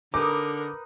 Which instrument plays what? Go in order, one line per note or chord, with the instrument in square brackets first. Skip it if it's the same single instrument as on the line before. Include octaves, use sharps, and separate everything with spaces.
[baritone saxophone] D3 [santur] D#4 B4 D#6 [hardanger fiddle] A#4 [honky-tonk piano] D6